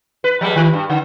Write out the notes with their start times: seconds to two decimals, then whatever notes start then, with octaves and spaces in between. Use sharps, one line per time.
0.24 B4
0.41 F3 G3 G#3
0.56 D#3
0.73 G2
0.90 D3